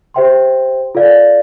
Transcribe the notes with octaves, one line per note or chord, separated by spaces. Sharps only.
G4 C5 E5 G5 C6
F4 A4 D5 F5